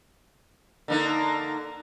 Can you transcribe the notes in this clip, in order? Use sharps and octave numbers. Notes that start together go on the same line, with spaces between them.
D3 A#3 D#4